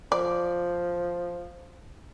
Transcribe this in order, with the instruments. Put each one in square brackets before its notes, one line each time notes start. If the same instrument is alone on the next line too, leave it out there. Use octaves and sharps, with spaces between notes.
[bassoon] F3 [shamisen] D5